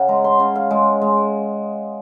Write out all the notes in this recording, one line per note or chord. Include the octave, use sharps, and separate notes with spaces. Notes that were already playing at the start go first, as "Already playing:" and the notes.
Already playing: C#3 F#5
G#3 A#5
C6
C#3
F5
G#3
G#3